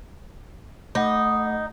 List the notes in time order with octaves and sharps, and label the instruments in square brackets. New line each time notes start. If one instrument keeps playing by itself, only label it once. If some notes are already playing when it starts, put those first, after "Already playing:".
[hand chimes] A3 F#5 [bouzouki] D#4